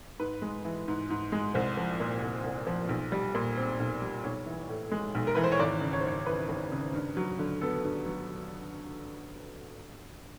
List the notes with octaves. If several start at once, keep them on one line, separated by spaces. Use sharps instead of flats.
G#2 B4
G#3
E3
G#2
G#2
G#3
C2 C5
F3
A#2
C2
C2
F3
B1
G3
A#2
C4
B1
G3
B1 C#5
E3
A2
G#3
B1
A#4
E3 B4
C5
C#5
G#1 D5
C#3
C#5
C5
F#2 C#5
E3 B4
G#1
C#3
G2
F#3
D3
B3 A4
G2
F#3